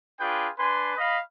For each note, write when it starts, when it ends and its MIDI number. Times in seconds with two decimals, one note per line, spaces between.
0.20 0.48 62
0.20 0.48 65
0.20 0.48 68
0.20 0.48 71
0.20 0.48 79
0.58 0.93 62
0.58 0.93 71
0.58 0.93 80
0.58 0.93 84
0.97 1.17 75
0.97 1.17 77
0.97 1.17 83